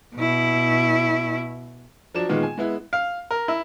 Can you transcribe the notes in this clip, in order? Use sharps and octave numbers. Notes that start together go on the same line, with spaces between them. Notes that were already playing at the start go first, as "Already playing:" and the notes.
B2 E4
F3 F#3 D4 E7
A#2 D#3 G#3 B3 F4
G#5
G#3 B3 E4
F5
A#4
E4